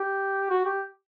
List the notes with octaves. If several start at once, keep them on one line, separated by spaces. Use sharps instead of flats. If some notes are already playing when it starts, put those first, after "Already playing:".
Already playing: G4
F#4
G4